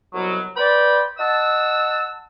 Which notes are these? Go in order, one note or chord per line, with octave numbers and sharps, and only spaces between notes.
C2 B2 F#3
B4 C5 D5 G5 B5
D#5 F#5 A5 E6